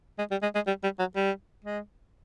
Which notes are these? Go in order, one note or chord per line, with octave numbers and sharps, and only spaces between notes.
G#3
G3
G#3
G#3
G3
G3
F#3
G3
G#3